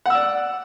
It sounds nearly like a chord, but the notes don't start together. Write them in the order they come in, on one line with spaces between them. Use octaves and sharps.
F#5 E6 D5